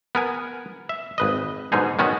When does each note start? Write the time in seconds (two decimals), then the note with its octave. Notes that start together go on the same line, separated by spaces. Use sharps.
0.15 B3 A#4 G#5
0.89 E5
1.18 G#1 B4 D#5
1.72 G#2 B2 D3 D#4 G#4
1.99 D#3 B3 C#4 F#4